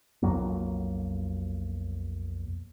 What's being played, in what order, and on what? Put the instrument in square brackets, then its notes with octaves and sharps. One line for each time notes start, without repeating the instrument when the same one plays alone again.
[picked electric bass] B1 F2 F#3 A#3